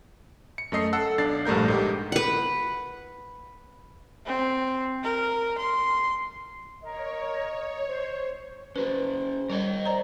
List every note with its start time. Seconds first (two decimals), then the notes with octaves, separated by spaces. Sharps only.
0.58 C#7
0.72 F#2 A3 D#5 C7
0.93 A4 F#5 E6
1.18 B1 D4 A6 C7
1.45 A#1 G2 A3 A#4 G6
1.68 G#2 D#4 G4
2.12 B4 F#5
4.26 C4
5.03 A#4
5.58 C6
6.83 A#4 C#5 D#5
7.87 C5
8.76 C#4 F#4 G#4 B4 C5
9.50 G3 A#4 C#5 D#5
9.85 C5 D5 A#5